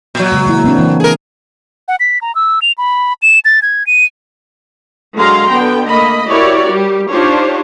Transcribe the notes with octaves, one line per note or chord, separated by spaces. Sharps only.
A#2 F#3
C#3 G#3
E3 A#3 E4
A#3 C4 D4
E3
G#4 A#4
F#5
B6
A#5
E6
F7
B5
E7
A6
G#6
D#7
D3 F#3 G#3 F5 A#5 C6
D3 B3 G5
A3 A#3 D#5 B5
E4 F#4 G4 A#4 C#5 D5
G3 G4
D4 D#4 F4 G4 C5 C#5